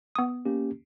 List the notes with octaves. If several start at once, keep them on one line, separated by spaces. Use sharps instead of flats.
B3 D#6
A#3 C#4 G4